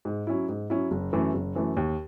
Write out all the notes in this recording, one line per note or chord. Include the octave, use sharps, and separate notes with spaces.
G#2
F#3 C#4 E4
G#2
F#3 C#4 E4
F#1
F#2 E3 A3
F#1
F#2 E3 A3
D#2